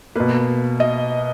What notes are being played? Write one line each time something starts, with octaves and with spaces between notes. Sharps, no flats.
B2 A#3 B4
D#5